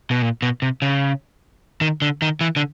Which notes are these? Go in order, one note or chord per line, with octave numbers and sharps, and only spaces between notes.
B2
A#2
B2
C3
C#3
D#3
D3
D#3
E3
D3